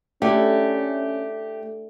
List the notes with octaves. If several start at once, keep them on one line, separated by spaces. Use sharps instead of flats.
A3 C#4 D4 E4 G4